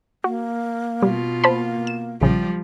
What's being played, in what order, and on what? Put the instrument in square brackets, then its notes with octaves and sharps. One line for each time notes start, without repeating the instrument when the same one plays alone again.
[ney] A#3 [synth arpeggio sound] F#4
[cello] B2 F4 [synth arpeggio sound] G3
[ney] A#3 [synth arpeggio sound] C5 A5 B5
[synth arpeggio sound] E7
[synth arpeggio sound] A#1 C#3 [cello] F3 G3